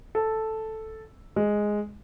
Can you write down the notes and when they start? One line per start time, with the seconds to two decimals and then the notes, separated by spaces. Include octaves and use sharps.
0.15 A4
1.36 G#3